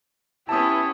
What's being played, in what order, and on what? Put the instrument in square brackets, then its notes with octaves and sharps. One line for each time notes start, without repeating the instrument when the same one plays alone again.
[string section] B3 C#4 G4 [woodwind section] E4 [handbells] A5 D#6